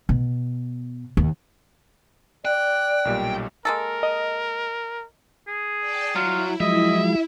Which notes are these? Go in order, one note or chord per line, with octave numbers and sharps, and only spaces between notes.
B2
D#2
D5 G5 F#6
B1 A#2 G3
G#3 A#3 A4 A#4
D#5
G#4
D5 G5 A5
F#3 E4 F4
F3 F#3 G#3 D#5 E5